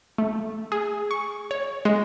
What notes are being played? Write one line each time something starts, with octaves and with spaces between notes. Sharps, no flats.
A3
G#4
C#6
C#5
G#3